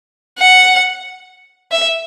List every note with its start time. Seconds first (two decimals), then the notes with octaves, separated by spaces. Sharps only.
0.39 F#5
1.72 E5